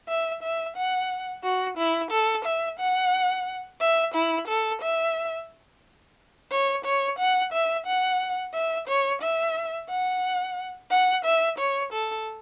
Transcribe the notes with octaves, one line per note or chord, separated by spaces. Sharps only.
E5
E5
F#5
F#4
E4
A4
E5
F#5
E5
E4
A4
E5
C#5
C#5
F#5
E5
F#5
E5
C#5
E5
F#5
F#5
E5
C#5
A4